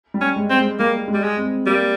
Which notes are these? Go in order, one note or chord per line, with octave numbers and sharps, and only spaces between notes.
G3
C#4
G#3
C4
G#3
G3 A#3
G#3
G3
G#3
C4
G3 A#3